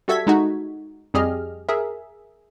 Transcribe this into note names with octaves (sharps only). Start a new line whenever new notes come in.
G3 F#4 A4 E5 G#6 B6
G#3 D#4 F#4
F2 G3 G4 G#4 D#5 F6
G#4 A#4 E5